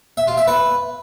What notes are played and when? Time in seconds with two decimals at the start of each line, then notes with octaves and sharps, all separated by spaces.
0.17 E5
0.27 F4
0.37 E5
0.48 B4